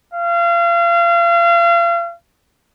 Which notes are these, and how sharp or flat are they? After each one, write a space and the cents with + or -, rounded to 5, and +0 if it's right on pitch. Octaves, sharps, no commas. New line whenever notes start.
F5 -35